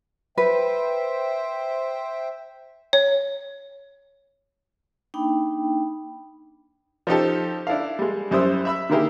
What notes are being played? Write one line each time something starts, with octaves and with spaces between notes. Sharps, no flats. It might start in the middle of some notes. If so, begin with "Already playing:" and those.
B4 C5 E5 G5
C#5
A#3 D4 D#4 G5 B5
F3 D#4 G4 A4
D4 E4 A4 F5
G3 G#3
F#2 G3 E4 C5 D#6 E6
E5 B5 E6
D3 D#3 A#3 E4 G4 G#4